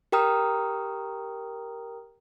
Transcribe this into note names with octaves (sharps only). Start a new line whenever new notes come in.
G4 A#4 G5 A#5 D#6 F6